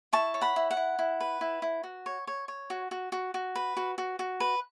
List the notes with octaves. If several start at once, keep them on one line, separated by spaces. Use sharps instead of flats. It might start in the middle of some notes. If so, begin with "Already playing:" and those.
E4 A5 C#6
C#5
F#5 B5
E4
F#5
E4
E4
B4
E4
E4
F#4
C#5
C#5
C#5
F#4
F#4
F#4
F#4
B4
F#4
F#4
F#4
B4